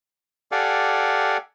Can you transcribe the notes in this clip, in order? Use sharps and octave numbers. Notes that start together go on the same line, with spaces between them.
G4 A4 D5 F5 F#5 G#5